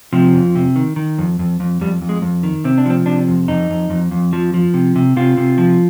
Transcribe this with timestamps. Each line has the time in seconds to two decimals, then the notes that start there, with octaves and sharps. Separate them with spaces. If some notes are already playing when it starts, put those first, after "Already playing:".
0.13 C3 F3
0.34 F2
0.55 C3
0.76 D#3
0.96 D#3
1.18 F2
1.39 F2
1.60 F2
1.81 F2 G3
2.02 F2
2.09 G#3
2.22 F2
2.43 D#3
2.64 C3 C4
2.78 D4
2.86 F3 C4
3.06 C3 D4
3.28 F2
3.48 F2 D#4
3.70 F2
3.90 F2
4.11 F2
4.33 F3
4.54 F3
4.74 C3
4.96 C3
5.16 C3 F4
5.37 C3
5.58 F3